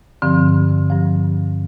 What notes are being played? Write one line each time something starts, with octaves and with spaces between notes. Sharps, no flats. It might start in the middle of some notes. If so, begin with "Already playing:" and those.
G2 D3 F3 C4
G2 F3